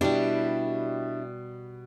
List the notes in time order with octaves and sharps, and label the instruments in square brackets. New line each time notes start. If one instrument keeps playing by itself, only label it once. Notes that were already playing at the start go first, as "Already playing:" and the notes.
[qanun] B2 G3 [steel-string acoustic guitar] D4 E4 G4